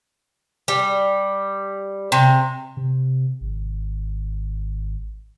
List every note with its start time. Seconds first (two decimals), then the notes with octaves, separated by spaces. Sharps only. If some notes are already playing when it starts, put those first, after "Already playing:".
0.68 G3
2.12 C3
2.77 C3
3.41 G#1